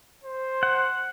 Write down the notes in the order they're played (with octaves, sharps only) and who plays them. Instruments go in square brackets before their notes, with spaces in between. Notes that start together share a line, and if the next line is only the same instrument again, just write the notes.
[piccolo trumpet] C5
[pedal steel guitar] F#5